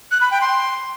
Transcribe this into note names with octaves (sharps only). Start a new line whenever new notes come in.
F#6
B5
G5
C6